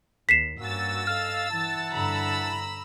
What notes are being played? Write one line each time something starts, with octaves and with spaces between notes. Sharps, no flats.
D#2 B6 C7 E7
G2 A#3 C#4 F#4 E6 A6
A4 D#5 F5 F6
E3 E4 F#5 A5
G2 D3 A#5 B5 E6